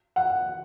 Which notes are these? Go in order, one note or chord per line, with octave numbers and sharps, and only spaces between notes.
F#5